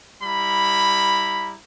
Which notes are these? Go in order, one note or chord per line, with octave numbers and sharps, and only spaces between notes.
G3 E4 A#5 B5